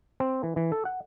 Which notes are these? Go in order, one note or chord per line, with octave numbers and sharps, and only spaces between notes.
C4
E3
E3
A4
F#5